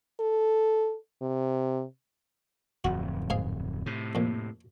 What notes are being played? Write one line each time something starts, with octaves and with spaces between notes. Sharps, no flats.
A4
C3
D1 F2 F#4
G#2 G#4 F5
A2 C3
F2 A#2